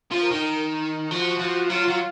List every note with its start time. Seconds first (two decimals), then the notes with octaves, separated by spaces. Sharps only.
0.12 F3
0.21 A#4
0.31 D#3
1.10 F3 F#4
1.39 F3
1.70 F#3 F4
1.88 F#3